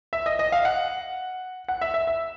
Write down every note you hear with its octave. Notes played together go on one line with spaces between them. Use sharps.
E5
D#5
D#5
F5
F#5
F#5
E5
E5
E5